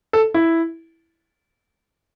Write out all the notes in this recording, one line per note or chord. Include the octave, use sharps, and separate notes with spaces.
A4
E4